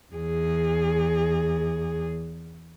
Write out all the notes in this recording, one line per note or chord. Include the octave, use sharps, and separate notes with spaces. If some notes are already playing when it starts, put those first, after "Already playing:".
E2 G#4